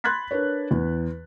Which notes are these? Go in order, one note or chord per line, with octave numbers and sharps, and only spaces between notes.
B5 C6 F#6 G#6 A6 B6
D4 A#4 B4 C#5
E2